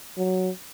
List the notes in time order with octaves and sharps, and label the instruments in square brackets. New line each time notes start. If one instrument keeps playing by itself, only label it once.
[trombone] F#3